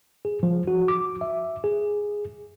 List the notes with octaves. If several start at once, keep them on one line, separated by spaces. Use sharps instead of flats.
G#4
F3
F#4
D6
E5
G#4